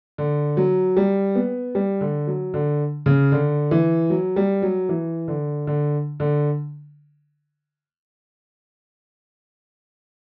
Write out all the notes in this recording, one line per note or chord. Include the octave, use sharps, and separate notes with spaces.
D3
F#3
G3
B3
G3
D3
F#3
D3
C#3
D3
E3
F#3
G3
F#3
E3
D3
D3
D3